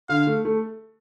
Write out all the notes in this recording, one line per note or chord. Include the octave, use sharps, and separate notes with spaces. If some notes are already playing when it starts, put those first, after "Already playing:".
D3 F5
A3
A3